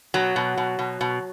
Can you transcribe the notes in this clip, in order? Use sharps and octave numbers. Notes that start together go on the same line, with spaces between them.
B2 F#3
B2
B2
B2
B2